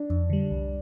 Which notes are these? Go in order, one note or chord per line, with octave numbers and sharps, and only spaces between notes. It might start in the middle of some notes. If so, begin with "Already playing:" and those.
Already playing: D4
F2
D3 G3
C2